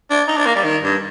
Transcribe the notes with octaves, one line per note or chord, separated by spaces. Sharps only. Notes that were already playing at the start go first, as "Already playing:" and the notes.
D4
D#4
D4
A#3
G3
D#3
G2